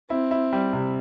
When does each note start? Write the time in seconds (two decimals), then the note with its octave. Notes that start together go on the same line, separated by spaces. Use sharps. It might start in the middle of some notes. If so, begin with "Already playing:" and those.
0.10 C4 E4
0.31 E4
0.53 G3
0.73 C3